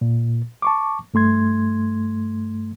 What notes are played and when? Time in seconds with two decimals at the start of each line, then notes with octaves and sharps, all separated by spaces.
0.01 A#2
0.62 A5 C#6 D6
1.14 G2 A3 C6 G#6